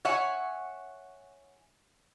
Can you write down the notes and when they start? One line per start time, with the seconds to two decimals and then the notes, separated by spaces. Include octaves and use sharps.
0.05 C#5 E5 F#5 G#5